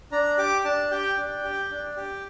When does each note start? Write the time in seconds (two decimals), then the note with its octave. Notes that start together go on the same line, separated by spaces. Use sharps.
0.12 D4 A#5
0.38 G4 D6
0.65 D4 A5
0.91 G4 G5
1.18 D4
1.44 G4
1.71 D4
1.97 G4